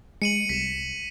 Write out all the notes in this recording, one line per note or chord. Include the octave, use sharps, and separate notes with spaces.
G#3 C#7 D#7 F#7
C2 B6 E7